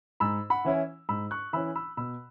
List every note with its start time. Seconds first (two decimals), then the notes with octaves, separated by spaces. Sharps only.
0.20 G#2 B5 E6
0.50 F#5 B5
0.65 E3 C#4 E4
1.09 G#2 B5 E6
1.31 C#6 F#6
1.53 E3 C#4 E4 B5 E6
1.76 B5 E6
1.97 B2 B5 E6